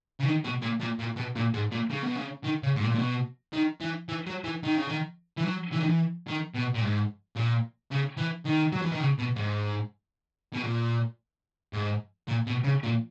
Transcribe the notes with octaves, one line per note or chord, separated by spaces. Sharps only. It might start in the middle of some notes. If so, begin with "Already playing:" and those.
C#3
D#3
B2
A#2
A#2
A#2
B2
A#2
G#2
A#2
C#3
B2
C#3
D#3
C#3
G#2
A#2
A#2
B2
D#3
E3
E3
F#3
E3
D#3
C#3
D#3
E3
F#3
E3
D#3
E3
D#3
B2
A#2
G#2
A#2
C#3
E3
D#3
F#3
E3
D#3
C#3
B2
G#2
B2
A#2
G#2
A#2
B2
C#3
A#2